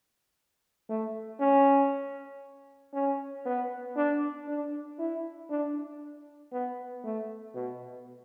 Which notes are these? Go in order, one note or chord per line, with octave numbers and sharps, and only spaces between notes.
A3
C#4
C#4
B3
D4
D4
E4
D4
B3
A3
B2